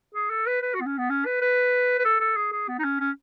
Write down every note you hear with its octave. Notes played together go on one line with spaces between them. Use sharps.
G#4
A4
B4
B4
F#4
B3
C#4
B3
C#4
B4
B4
B4
A4
A4
G#4
G#4
B3
D#4
C#4
C#4